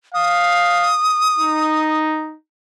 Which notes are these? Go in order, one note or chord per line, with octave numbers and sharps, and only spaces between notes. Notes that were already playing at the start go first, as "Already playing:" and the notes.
F5 D#6
D#4